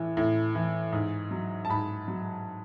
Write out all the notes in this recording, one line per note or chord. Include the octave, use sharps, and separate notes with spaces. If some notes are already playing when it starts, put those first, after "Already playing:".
Already playing: A2 E3
A2
E3
G#2
F#3
A5
G#2 B5
F#3